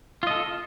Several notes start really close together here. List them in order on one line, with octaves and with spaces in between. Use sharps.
F4 D#5 A4